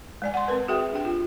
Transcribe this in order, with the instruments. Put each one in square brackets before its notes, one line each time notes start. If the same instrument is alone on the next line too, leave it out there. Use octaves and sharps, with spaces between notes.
[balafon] G#3 D5 G#5
F#5 C6
C4 A#4 B4
F#4 G#4 E5 G5
D4 G4 G5
F4